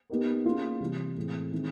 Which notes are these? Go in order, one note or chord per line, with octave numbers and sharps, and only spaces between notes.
B3 D#4 G4 A#4
A#3 C#4 F4 G#4
C3 E3 G3
A2 E3 G#3 C4
D#3 G#3 C4 E4